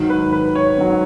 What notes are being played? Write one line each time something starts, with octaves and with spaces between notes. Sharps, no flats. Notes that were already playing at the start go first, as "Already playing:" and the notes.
Already playing: G#2 D#3 F#3
B4
B4
C#5
G#2 D#3 F#3